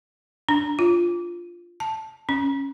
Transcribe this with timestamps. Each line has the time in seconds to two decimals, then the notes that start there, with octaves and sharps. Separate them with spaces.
0.49 D4
0.79 F4
1.80 A5
2.29 C#4